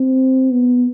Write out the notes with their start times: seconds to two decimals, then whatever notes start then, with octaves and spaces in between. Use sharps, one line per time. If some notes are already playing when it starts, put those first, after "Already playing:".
Already playing: C4
0.51 B3